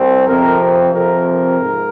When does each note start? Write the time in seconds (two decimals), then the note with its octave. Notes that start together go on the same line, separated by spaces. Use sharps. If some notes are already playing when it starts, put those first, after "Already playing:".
Already playing: C2 C4
0.26 F2 C3 F3 C4 A#4
0.93 F2 C3 F3 C4 A#4
1.28 A#4
1.61 G#2